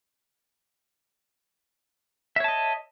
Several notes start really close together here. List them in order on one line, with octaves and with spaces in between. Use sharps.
E5 C#5 A5 D#5